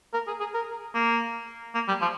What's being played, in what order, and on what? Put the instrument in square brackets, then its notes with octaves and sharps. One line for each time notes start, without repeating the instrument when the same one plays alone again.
[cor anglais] A#4
G#4
G#4
A#4
A#3
A#3
G3
F3